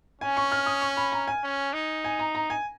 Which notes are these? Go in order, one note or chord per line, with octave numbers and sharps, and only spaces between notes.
C#4 G#5
C#6
F6
D#6
C#6
B5
A#5
G#5
C#4
D#4
G#5
A#5
A#5
G#5